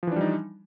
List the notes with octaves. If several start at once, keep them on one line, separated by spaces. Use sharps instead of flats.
E3 F3 G3 D4 D#4